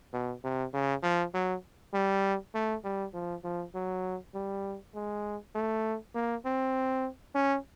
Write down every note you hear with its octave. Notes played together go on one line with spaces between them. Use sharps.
B2
C3
C#3
F3
F#3
G3
A3
G3
F3
F3
F#3
G3
G#3
A3
A#3
C4
C#4